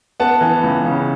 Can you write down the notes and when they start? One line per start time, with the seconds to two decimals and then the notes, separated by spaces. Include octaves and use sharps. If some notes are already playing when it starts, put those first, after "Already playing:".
0.20 B3 F#5 A5
0.41 E3
0.63 C#2
0.85 C#3